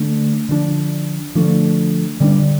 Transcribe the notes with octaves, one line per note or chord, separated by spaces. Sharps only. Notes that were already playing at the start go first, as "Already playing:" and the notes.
Already playing: D3 A3 D4
D3 F3 A3 D4
D3 F3 A3 D4
D3 G3 A#3 D4